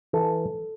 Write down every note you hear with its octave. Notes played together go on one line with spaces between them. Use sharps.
E3 A4